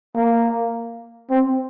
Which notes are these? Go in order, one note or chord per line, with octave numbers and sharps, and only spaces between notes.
A#3
C4